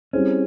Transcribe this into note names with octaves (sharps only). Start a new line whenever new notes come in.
G3 C4 C#4 E4 G#4 C5